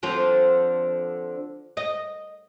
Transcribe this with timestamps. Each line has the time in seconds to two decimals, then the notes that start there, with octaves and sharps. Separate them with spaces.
0.03 D3 F3 C4
1.77 D#5